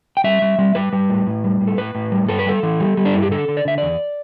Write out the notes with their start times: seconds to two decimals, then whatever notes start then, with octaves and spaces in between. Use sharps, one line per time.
0.17 G5
0.24 G3 E5
0.42 G3
0.59 G3
0.75 G3 B4
0.93 G3
1.09 A2
1.27 A2
1.44 G3
1.61 A2
1.67 A4
1.78 A2 B4
1.95 A2
2.12 G3
2.28 G2 A4
2.39 B4
2.46 G3 A4
2.63 E3
2.80 G3
2.97 G3
3.05 D4
3.14 G2 E4
3.22 G4
3.31 D3 A4
3.48 D3
3.57 D5
3.65 D3 E5
3.78 E2 D5